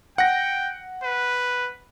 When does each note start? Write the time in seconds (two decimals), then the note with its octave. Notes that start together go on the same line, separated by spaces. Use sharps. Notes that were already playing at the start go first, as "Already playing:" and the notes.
0.18 F#5 G5 A#6
1.04 B4